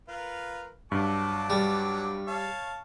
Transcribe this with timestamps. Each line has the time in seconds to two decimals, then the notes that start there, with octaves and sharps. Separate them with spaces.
0.08 F4 A#4 B4
0.92 G2 F#3 A5 D6
1.50 G3
2.27 C#5 F5 A5